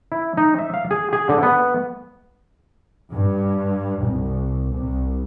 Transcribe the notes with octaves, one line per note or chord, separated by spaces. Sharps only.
E4
D#4
E5
F5
G#4
G#4
D3
B3
G2
C2
C2